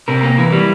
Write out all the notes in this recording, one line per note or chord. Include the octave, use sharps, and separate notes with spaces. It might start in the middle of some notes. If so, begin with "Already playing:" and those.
C3 A#4
A#3
E3
G3